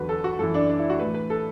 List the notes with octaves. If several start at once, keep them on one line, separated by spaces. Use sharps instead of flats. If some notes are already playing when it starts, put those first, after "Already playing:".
Already playing: E2 D3 F#3 F#4 B4
A4
F#4
F#2 E3 A4
D4
D4
E4
F#4
A2 E3 B4
B4
A4